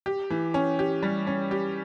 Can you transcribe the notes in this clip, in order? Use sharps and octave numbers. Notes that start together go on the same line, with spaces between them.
G4
E3
C#4
G4
G3
C#4
G4